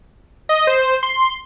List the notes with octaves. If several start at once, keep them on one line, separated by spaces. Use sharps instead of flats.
D#5
C5
C6